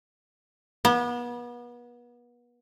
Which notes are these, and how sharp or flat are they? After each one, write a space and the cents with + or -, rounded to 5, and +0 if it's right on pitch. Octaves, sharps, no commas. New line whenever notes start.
B3 -35